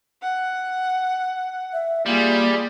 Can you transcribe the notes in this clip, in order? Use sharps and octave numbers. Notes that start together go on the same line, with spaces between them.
F#5
E5
G3 A#3 F4 G#4